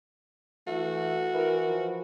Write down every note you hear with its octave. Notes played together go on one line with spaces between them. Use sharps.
E3 A3 F#4
E3 A#4
F3